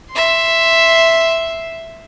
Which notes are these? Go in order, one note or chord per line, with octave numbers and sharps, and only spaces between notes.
E5 C6